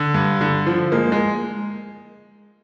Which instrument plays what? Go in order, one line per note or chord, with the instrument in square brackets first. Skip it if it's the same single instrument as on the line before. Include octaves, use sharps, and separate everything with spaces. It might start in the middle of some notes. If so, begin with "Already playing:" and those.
Already playing: [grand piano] D3
G2
D3
F3
G#3 A#3
G#3